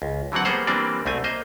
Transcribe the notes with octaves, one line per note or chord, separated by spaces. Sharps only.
C#2
D3 E3 F#3 C4 F#5
G3 A#3 B3 G#4 C5 F#5
E3 G3 A#3 C4 D4 D5
C2 A3 C4 G#5
A#3 C5 D#5